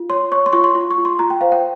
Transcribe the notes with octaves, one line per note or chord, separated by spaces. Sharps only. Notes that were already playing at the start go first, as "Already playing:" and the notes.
Already playing: F4
C#5 C6
C#5 C#6
C6
F4 C#6
C6
F4
C#6
F4
C6
F4 A#5
G5
C5 F5
G5